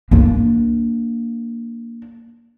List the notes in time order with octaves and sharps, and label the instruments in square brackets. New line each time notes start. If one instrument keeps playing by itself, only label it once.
[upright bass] A#3 D4